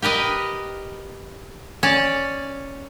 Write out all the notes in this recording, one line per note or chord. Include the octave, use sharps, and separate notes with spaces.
G4 A#4 B4 D#5
C#4 D5